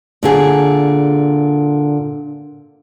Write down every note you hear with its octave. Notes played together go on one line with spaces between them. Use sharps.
A#2 D3 G#4